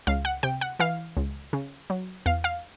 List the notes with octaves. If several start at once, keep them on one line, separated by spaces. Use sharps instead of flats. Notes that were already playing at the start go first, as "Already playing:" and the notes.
C#2 F5
F#5
C3 G5
F#5
E3 F5
C#2
C#3
F#3
E2 F5
F5